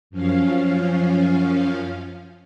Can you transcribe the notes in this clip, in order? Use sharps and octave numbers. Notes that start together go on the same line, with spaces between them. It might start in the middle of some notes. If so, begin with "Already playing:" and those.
F#2 F3 C#4 F5